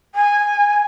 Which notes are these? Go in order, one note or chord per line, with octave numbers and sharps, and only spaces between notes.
G#5